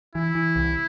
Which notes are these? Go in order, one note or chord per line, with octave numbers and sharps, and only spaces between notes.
E3 E4
E3
C2